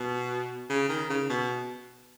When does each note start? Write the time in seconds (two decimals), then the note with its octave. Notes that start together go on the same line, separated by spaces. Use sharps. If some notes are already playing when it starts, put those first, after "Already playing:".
Already playing: B2
0.70 C#3
0.89 D#3
1.10 C#3
1.29 B2